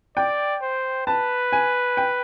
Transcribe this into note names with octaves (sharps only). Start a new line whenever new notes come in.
D5 G5
C5
B4 A5
G#5
G5